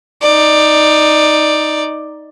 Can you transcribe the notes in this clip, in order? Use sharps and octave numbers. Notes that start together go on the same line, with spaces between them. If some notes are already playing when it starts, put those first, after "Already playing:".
D#4 D5